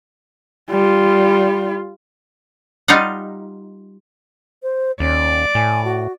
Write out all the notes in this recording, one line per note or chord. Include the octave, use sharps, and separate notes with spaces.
G3 F4
G3 D#4 F4 D#5 F5 F#5
C5
D#2 C#4 D5
A2 G#5
F#4